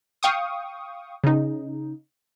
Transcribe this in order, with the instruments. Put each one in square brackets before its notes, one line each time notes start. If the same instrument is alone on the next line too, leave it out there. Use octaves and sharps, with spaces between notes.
[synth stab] F5 G5 C#6 D#6
C#3 D#4